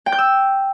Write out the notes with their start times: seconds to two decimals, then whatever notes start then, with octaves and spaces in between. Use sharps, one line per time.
0.06 G5
0.12 G6
0.19 E6